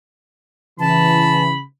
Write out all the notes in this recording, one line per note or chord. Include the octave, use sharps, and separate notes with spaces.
C#3 E3 A5 B5